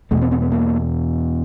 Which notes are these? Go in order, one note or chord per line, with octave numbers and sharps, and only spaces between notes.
E2 B2 A3
C4
C4
B3
A#3